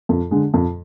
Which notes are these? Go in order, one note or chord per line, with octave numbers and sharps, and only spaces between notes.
F2
D3 G#3
F2